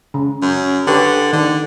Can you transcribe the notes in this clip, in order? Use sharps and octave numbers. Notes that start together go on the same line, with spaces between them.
C#3
F#2
D3 G4 B4 C#5
D3 D#3